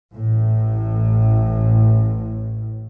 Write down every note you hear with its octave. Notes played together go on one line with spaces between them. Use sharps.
A1 A2